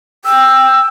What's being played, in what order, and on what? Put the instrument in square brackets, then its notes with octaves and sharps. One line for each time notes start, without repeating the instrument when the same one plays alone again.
[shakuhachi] G5 [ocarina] E6